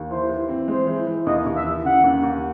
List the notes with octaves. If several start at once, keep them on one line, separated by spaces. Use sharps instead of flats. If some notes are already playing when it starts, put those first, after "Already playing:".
Already playing: D#2
E3 C5
E3
C4
G#3 C5
E3
E3
D#2 D#5
D#2
E5
E3
C#3 F#5
D#2
D#2